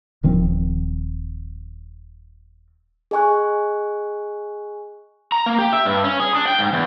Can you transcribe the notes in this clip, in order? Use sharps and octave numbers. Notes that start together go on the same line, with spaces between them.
D#1 D#3 F3 C4
G#4 D#5 G#5 C#6 F#6
A#5
A#3
G4
E5
G2
C#4
G#4
D4
G5
G#2
E2